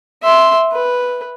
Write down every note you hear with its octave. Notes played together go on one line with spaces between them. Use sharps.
E5 C6
B4